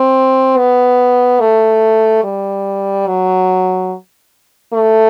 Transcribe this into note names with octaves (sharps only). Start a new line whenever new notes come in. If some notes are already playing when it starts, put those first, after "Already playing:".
Already playing: C4
B3
A3
G3
F#3
A3